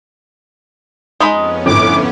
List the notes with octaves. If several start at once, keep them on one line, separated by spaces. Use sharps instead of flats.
F2 G#3 B3 C#4 D#4 B5
G1 A2 D6